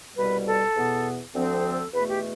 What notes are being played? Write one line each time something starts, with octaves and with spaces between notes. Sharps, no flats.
C2 B2 G3 B4
A4
E2 B2 B3
D2 D3 F3 C4
A4
E2 B2 A3 B4
G4